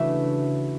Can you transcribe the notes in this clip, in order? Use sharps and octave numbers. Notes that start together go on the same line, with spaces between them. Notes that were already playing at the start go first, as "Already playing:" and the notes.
Already playing: C#3 E3 A3 D4 E4 F#4 E5